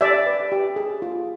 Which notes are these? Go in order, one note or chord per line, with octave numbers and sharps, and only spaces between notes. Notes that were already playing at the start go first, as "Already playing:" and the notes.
G4 D5 E5
B4
G4
G#4
F4